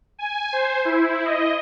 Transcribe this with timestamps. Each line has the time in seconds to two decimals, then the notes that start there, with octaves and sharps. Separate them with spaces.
0.19 G#5
0.53 C5
0.85 E4
1.26 D#5